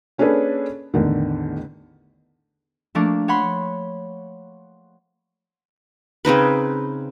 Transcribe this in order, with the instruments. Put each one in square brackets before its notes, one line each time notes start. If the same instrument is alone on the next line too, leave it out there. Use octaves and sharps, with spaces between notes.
[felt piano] A#3 C#4 D4 G#4 A4 B4
A1 E2 D3 D#3
[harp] F3 A3 A#3 D4
C#5 F#5 B5 C6
[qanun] C#3 C4 D#4 B4